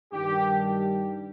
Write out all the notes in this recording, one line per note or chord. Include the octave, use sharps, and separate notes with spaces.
G2 D#3 G3 D4 G4